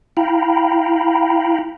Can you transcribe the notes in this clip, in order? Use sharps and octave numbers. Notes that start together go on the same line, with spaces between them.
E4 F5 G5 A#5 B5